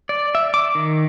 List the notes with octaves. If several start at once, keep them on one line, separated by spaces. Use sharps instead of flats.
D5
E5
D6
D#3